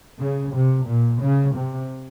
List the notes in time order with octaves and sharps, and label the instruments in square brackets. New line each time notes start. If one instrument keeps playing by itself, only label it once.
[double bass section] C#3
C3
A#2
C#3
C3